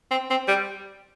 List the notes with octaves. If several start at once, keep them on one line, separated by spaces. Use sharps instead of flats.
C4
C4
G3